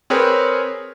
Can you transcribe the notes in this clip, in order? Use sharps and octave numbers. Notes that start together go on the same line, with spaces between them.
C4 G#4 A#4 B4 C#5 G5